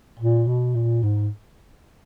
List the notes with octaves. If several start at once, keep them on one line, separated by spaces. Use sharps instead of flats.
A#2
B2
A#2
G#2